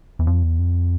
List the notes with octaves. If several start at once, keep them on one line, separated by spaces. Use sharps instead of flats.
E2
F2
E2
F2